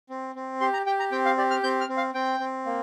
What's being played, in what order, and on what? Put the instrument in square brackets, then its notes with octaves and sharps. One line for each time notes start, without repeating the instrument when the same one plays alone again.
[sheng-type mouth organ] C4
C4
G4 C6
A#5
G4 G5
A#5
C4 G5
F5
G4 D5
F6
C4 G6
F6
C4
F5
C4 G5
C4
A#3